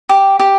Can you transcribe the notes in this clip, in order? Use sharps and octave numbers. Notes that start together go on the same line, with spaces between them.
G4
G4